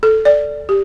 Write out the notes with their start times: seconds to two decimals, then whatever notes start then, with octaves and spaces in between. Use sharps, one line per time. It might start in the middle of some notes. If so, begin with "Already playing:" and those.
0.03 A4
0.25 D5
0.69 G4